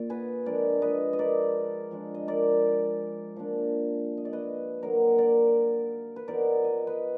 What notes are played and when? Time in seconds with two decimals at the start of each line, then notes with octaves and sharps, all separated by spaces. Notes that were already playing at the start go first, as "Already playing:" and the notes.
Already playing: A#2 A#3 D5
0.10 G#4 B4
0.46 F3 G#3 D4 A#4 D5
0.82 B4 D#5
1.13 D#5
1.19 A#4 D5
1.91 F3 G#3 D4
2.14 D#5
2.28 A#4 D5
3.36 F3 A#3 D4
4.17 D#5
4.25 D5
4.33 B4 D#5
4.82 D3 F#3 A#3 D#4 A#4 D5
5.18 A#4 D5
6.16 B4
6.27 F3 B3 D#4 A#4 D5
6.64 D#5
6.87 B4 D#5